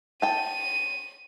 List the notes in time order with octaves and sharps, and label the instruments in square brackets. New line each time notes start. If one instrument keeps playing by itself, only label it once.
[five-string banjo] G5 A5 [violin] D#7